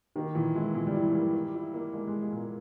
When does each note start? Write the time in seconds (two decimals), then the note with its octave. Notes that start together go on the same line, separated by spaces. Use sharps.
0.16 D#3 A#3
0.35 A#2 E3
0.54 G#3 E4
0.74 A#2 G#3
0.87 G3
0.95 E4
1.00 E3
1.12 G3 A#3
1.33 A#3
1.54 E4
1.74 A#3
1.93 G#3 A#3
2.07 G#3 G#4
2.22 G#3
2.32 A#2 A#3